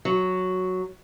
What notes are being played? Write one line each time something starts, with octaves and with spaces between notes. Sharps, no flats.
F#3